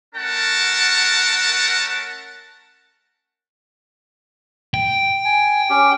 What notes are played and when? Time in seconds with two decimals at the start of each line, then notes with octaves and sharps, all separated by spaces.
0.15 A3 C#4 A#4 F#5 A5
4.74 G5
5.25 G#5
5.70 C#4 G4